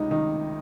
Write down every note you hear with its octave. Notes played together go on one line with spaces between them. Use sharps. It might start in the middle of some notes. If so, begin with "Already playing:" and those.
Already playing: C#2 C3 D#4
D#3 D#4